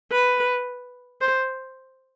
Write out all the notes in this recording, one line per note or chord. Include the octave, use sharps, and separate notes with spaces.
B4
C5